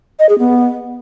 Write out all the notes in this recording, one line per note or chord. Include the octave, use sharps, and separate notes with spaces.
D#5
G#4
B3